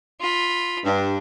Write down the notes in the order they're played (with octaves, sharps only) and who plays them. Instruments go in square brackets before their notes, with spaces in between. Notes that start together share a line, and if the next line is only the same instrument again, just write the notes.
[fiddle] F4 B5
[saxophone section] G2 [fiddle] D4